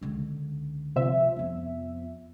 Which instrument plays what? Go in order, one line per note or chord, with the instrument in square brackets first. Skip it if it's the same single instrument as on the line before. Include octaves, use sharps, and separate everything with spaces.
[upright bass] C#2 D3
[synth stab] C3 F3 E5
[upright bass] F2 B3